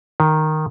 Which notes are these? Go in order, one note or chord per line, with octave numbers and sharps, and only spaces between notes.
D#3